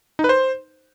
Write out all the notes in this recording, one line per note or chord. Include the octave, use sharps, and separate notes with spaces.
D#4
B4
C5